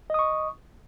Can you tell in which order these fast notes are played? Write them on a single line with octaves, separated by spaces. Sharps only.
D#5 D#6 C#6